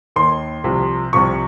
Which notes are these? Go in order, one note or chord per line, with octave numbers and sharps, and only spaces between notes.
D#2 D#3 C6
C2 C3 F3
C2 C3 F3 C#6